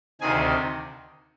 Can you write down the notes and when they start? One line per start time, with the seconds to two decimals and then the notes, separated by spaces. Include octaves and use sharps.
0.21 D2 C3 D#3 G#4 G#5